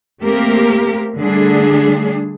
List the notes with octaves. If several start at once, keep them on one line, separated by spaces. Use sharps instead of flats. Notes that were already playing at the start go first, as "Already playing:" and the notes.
A3 A#3 C4 G4 A#4
D3 G3 A3 D4 G#4